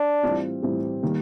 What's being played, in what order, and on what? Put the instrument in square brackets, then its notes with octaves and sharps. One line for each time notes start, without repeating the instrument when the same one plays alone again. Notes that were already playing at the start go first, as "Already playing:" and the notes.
Already playing: [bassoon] D4
[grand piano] A2 E3 G3 C4 F4
A2 E3 G3 C4 F4
D#3 G3 A#3